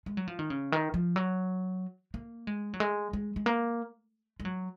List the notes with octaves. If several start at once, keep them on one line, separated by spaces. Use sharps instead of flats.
G#3
F#3
F3
D#3
C#3
D#3
F3
F#3
A#3
G#3
F#3
G#3
G#3
G#3
A#3
G#3
F#3